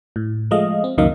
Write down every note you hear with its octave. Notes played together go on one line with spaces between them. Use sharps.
A2
F3 G#3 A3 D#5 F5
C4
C#2 F#2 D#3 A#3 D#5 F5